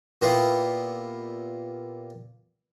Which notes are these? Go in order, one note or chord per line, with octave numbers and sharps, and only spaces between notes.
A#2 B3 E4 F4 G4